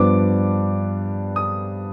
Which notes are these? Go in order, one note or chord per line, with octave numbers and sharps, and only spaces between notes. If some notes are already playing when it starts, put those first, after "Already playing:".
Already playing: G2 F3 B3 D4 D6
D#6